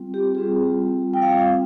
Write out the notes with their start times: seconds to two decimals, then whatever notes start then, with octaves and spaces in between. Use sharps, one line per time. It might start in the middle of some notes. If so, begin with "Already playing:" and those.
Already playing: G3 C4 F4
0.14 G4
0.35 G3 C4 F4 G#4
1.14 G5
1.22 G3 C4 F4 F5